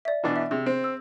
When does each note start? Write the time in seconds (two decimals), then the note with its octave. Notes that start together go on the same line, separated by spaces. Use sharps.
0.05 D5 E5
0.24 B2 E3 D4
0.36 E5
0.51 C3 G#4
0.66 C4
0.84 E6